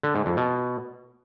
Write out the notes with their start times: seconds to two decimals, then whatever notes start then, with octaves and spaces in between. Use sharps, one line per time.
0.03 D3
0.15 G#2
0.26 F2
0.37 B2